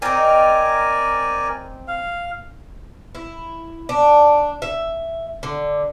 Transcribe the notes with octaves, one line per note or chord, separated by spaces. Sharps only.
C4 D#4 A#4 D5 G#5
F5
E4
D4
E5
D3